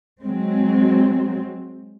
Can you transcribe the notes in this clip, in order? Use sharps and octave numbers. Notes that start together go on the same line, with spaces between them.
F#3 G#3 C4